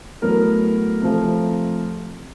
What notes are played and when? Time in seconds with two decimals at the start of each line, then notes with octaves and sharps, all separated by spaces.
0.22 A2 F#3 B3 A#4
1.02 C3 F3 A3